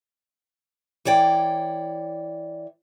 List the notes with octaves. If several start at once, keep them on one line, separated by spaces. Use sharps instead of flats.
E3 C#5 D5 G5